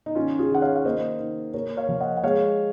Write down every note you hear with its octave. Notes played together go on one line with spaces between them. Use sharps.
D#4
D#3 C#4 F4
F4 G#4
D#3 F#5
C#5 F5
F5
A#3 C5 D#5
D#3
A#3 A#4 C#5
C#5 F5
F3
D#5 F#5
F#5
G#3 C#5 F5